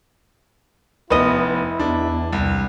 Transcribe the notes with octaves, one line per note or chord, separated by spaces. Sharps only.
F1 B3 E4 B4 D#5 D#7
E2 D4
C2